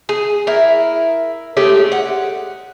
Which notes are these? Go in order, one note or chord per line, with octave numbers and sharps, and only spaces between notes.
G#4
E4 A#4
G#3 A3 C#4 G4
F#5